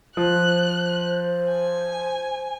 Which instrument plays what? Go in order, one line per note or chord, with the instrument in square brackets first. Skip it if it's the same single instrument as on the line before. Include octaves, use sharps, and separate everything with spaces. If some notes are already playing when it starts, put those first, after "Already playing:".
[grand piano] F3 [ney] C5 [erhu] F#6
[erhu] G#5